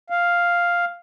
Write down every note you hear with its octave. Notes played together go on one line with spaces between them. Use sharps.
F5